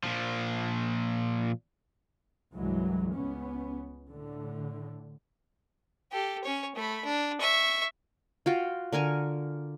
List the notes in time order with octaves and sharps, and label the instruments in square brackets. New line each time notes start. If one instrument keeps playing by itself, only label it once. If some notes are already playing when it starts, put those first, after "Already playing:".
[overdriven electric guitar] A#2 F3
[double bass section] C2 G2 E3 F#3 G#3
C#2 B3 C#4
A2 D3
[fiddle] G4 A4
C#4 C#5
A3 B5
D4
E5 C#6
[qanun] F4 F#4 G5
D3 A#4 G#5 C#6